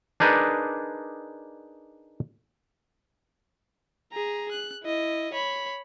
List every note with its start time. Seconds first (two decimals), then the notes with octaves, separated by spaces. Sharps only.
0.20 D4 D#4 G#4 A#4 B4 D5
4.13 G#4 A#5
4.52 F#6
4.84 E4 D#5
5.33 C#5 B5